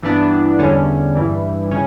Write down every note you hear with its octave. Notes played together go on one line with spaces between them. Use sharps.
G2 E3 B3 D4
E2 D3 G3 C#4
G2 E3 G3
C#3 C#4